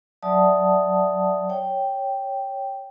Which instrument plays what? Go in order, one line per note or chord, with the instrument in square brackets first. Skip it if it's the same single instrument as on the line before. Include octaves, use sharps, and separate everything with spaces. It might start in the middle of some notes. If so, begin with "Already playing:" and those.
[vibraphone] F#3 D5 E5 F#5 A5 D#6
C#5 G5